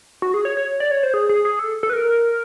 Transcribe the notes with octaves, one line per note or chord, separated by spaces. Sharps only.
F#4
G#4
C#5
C#5
D5
C#5
C5
G#4
G#4
G#4
A4
A4
B4
A#4